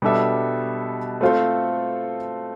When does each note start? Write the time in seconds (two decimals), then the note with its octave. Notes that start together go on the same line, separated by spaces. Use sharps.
0.02 B2 G3 D4 A4 E5
1.21 A3 C4 F4 A4 C5